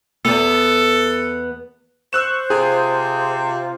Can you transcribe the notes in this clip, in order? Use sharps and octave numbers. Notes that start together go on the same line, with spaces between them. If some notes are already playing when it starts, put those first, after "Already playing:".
E2 B3 A4
C5 C#6 E6 F#6 E7
C3 F4 G#4